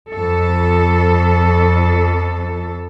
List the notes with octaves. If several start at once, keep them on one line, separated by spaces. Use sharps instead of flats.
F2 A4